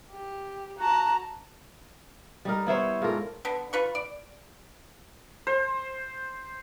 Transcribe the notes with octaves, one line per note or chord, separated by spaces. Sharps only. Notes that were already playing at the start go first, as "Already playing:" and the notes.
G4
F#4 A5 A#5
G3 D#4 A#4
B3 E4 C5 C#5
G#2 F4 A4 A#4
D3 B3
F4 B4 C#6
D5
C5